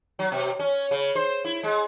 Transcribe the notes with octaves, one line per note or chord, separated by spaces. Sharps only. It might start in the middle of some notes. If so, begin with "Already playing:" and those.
F#3
B2
C#4
C#3
C5
E4
G#3